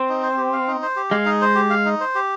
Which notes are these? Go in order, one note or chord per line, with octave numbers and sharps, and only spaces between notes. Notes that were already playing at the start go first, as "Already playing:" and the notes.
Already playing: C4
D#4
C5
G4
F5
D#4
C5
G4
G#3 F5
D#4
C5
G4
F5
D#4
C5
G4